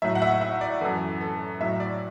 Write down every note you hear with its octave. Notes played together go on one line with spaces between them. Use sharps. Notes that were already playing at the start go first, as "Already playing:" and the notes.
A2 F#3 E5
F#5
E5
E5
D5
F#2 E3 A4
A4
A2 F#3 E5
D5